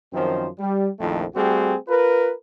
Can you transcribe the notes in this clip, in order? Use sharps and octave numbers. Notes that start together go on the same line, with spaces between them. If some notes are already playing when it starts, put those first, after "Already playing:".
F#2 D#3 F3 C4 C5
G3
A#1 F2 D#3 A3 E4
G3 A3 C4 F#4 G#4
F4 A#4 B4